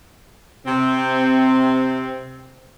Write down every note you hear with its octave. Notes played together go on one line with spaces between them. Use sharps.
C3 C4